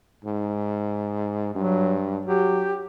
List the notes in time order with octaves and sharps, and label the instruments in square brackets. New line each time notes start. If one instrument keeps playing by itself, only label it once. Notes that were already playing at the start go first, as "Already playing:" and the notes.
[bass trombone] G#2
[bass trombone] G2 [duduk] F#3
[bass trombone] F#3 [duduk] G4